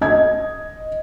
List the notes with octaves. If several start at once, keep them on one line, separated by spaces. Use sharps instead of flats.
D#5 G#6